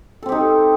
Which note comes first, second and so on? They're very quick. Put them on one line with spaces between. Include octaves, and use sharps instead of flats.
A4 C4 G4 D#4